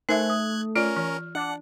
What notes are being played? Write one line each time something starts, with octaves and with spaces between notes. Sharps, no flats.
A3 D#4 A#4 C5 E5 G#5 F#6 G#6
D#6
C#4 F4 A#4 D5 F6
E3 F6
D4 F#5